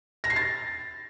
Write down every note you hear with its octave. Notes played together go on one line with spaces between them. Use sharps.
A#6
C7
A6